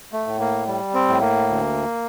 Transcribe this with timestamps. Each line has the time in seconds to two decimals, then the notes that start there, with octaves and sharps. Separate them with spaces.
0.13 A3
0.27 A2
0.40 A#3
0.67 G3
0.94 C4
1.08 A2
1.21 A#3
1.48 D2